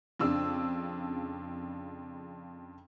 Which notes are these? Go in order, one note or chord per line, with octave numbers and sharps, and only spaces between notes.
F2 C#3 D4 E6